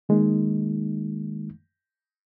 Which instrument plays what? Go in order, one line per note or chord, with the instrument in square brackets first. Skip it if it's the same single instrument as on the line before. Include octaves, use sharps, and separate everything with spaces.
[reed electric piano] D#3 G#3 A#3 D#4